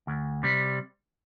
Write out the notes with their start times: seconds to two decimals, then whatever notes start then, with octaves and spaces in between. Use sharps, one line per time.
0.07 D2
0.43 C3 G3